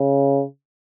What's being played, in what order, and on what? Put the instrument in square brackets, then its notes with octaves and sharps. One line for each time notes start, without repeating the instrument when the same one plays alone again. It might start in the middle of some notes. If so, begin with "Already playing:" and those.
Already playing: [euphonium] C#3